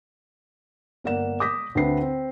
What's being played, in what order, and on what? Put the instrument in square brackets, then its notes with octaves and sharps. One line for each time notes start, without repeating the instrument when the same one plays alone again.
[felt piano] G1 A#3 A#4 D5 F#5 E7
D6 D#6 G6 A#6 B6
D2 D3 C4 B4 C7
C4